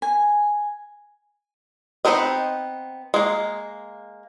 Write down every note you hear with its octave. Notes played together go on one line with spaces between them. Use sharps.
G#5
B3 C4 D#4 A#4 D#5
G#3 A#3